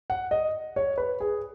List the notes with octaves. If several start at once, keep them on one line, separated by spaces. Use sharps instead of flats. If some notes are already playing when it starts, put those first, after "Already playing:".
F#5
D#5
C#5
B4
G#4